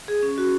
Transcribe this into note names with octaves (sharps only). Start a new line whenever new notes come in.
G#4
C#4
F#4